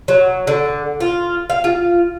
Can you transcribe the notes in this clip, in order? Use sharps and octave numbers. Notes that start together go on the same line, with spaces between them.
F#3
D3
F4
F5
F4